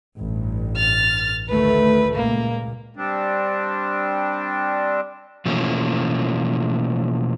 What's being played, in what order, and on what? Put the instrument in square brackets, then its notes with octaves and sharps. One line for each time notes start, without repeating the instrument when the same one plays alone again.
[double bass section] A1 G2
[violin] F6 A6
[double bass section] D2 D#3 A3 [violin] B4
[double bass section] C#2 A#2 [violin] A#3
[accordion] G3 C4 D4
[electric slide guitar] B2 E3 F3 A3 A#3 C#4